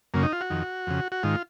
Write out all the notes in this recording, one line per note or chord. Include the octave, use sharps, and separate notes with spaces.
F#2 C#3 A#3
D#4
F4
F#4
F2 D#3
F2 C#3
F#4
G#2 D#3 F4